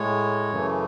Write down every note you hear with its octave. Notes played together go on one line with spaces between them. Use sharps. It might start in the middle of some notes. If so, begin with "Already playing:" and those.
Already playing: A2 G#3 C#5
F#2 C#3 E3 A3